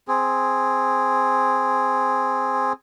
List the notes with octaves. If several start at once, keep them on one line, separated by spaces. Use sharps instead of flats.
C4 G#4